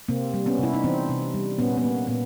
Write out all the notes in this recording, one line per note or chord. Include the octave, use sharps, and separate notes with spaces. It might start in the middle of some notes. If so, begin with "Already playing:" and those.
C3 A#3 C4
G3
B3 C#4
C3 E4
D#4
E3 C4 D4
C3
G3
A#2 B3 C#4
B3
A#3
A#2 B3